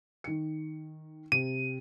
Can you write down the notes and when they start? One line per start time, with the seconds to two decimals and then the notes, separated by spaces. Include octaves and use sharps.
0.24 D#3 C#7
1.32 C3 D#7